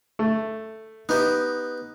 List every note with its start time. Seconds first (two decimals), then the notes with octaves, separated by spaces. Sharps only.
0.19 A3
1.09 B3 D#4 G4